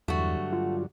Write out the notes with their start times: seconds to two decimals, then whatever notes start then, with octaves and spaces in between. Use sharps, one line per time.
0.08 E2 G2 D3 F#3 A3 F#4
0.53 F4